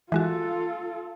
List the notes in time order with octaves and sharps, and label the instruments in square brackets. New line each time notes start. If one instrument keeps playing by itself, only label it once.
[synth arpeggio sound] E3 G#3 F#4 [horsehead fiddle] F4 A4